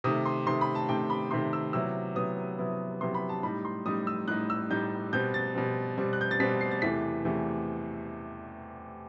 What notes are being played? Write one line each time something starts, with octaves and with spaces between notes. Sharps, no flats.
C3 D#3 A3 D#6
C6
C3 D#3 A3 C6
B5
A5
C3 D#3 A3 G5
B5
C3 D#3 A3 C6
E6
C3 F#3 B3 E4 E6
C3 F#3 B3 E4 D#6
C3 F#3 B3 E4
C3 F#3 B3 E4 C6
B5
A5
A2 G3 D#4 B5
C6
A2 G3 D#4 D#6
E6
A2 G3 D#4 F#6
E6
A2 G3 D#4 G6
B2 G3 C4 G6
A6
B2 G3 C4
B2 G3 C4
F#6
G6
A6
B2 G3 C4 B6
C7
A6
E2 C3 E3 A3 B6
E2 C3 E3 A3